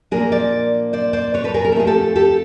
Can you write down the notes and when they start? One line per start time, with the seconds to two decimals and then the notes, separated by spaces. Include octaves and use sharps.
0.11 A#2 F3 A#3 D4 G#4 A#4
0.32 C5 D5
0.93 C5 D5
1.13 C5 D5
1.34 B4 C#5
1.44 A4 B4
1.54 G#4 A#4
1.65 A#4
1.72 A4
1.75 F3 A3 C4 E4 G#4
1.87 G4 A4
2.16 G4 A4